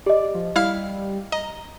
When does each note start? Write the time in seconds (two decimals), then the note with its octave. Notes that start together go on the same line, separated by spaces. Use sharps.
0.06 G4 D5 D#5
0.35 F3
0.56 G3 E4 F5 F6
1.32 D#5 A#5